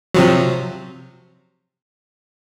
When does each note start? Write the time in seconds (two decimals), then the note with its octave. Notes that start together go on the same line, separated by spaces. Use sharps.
0.14 C3 F3 F#3